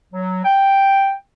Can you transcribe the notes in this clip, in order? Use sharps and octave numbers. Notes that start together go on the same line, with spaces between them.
F#3
G5